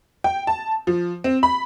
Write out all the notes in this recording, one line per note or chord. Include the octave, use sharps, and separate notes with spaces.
G5
A5
F3
C4
B5